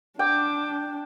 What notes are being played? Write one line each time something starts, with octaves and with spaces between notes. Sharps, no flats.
D4 G5 D6